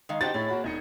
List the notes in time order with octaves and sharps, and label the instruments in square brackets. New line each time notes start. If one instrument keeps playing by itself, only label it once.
[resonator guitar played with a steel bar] D#3 G#3 F5
[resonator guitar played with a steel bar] D4 D#4 F#4 [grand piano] G4 C5 G5 [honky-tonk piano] A6
[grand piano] A2 E4 B5 [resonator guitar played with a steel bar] G#4 [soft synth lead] C#5
[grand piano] A#3 F#4 B5
[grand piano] E1 D#4 C#7 [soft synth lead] G#6